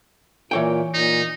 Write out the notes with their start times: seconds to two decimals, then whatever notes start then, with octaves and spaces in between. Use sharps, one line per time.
0.51 A#2 E3 C#5 G5
0.94 A#2 D#4